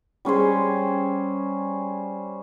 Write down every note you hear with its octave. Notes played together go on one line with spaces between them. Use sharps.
G3 C#4 G#4 C5